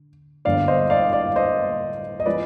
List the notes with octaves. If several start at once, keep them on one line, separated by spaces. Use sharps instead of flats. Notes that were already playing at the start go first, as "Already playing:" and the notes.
Already playing: D3
G1 G2 D3 G#3 B3 D5 F5
C5 D#5
D5 F5
D5 F5
C5 D#5
D#5
F3 G#3 B3 B4 D5